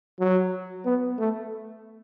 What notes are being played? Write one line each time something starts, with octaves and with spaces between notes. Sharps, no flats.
F#3
B3
A3